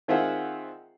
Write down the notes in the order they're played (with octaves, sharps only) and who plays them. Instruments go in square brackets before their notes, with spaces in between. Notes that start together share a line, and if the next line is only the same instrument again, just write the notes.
[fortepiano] D#3 C4 F4 G#4 E5 F#5